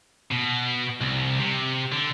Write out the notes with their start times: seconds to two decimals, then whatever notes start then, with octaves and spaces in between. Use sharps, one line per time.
0.32 B2
1.01 C2
1.40 C3
1.92 D3